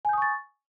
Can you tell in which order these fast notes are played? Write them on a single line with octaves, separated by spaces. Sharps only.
G#5 G6 D#6 C#6 A6